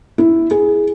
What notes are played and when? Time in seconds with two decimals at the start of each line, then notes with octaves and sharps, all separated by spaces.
0.18 E4
0.51 G#4